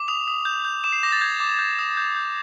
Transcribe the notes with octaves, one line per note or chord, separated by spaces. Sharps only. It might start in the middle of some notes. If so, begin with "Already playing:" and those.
Already playing: D6
D#6 F7
D#6
G6
G6
D6 E7
C7
D6 A#6
A6
G6 G#6
D6
G6
D#6
G6
G6